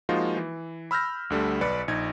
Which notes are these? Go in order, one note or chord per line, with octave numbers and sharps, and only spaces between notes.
F3 G#3 A#3 D#4 F4 F#4
E3
B5 E6 F6 G6 A#6
D2 D3 G3 A3
B1 B4 D5 B5 C#7
A#1 D#4 G#6